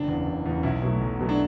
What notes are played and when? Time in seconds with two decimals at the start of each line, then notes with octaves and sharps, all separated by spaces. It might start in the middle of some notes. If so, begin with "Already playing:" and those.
Already playing: F#1 D4
0.08 E2 C#3
0.26 F#1
0.46 E2 C#3
0.63 B1 E4
0.82 B2 F#3 A3
1.01 B1
1.20 B2 F#3 A3
1.29 D4